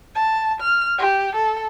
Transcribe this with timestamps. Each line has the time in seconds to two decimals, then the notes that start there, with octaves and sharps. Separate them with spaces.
0.15 A5
0.61 F6
0.98 G4
1.35 A4